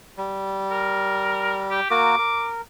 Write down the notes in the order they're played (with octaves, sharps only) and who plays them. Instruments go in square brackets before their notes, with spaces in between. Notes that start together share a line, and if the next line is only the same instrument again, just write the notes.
[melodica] G3
[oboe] A#4
G4
[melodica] A#3 F#4 A#4 [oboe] D6
[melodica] A#4